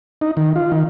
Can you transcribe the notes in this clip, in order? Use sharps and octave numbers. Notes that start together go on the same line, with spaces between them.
D#4
D#3
F4
D#3